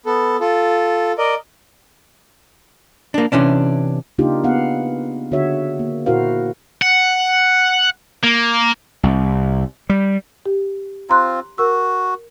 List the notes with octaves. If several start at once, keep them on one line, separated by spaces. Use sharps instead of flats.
B3 A4
F4 A4
A#4 D5 D#5
A#3 D4
C3 E3 C#4 D4
C#3 A#3 D4 D#4 F4 G4
B3 F5 F#5
D3 F#4 G#4 C#5 E5
A#3
A#2 E4 F#4 A#4 C5 F5
F#5
A#3
C2
G3
G4
C4 F4 A#5 C6 F#6
F#4 A#4 E6